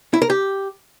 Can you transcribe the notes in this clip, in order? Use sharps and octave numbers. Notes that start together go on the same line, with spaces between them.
E4
A#4
G4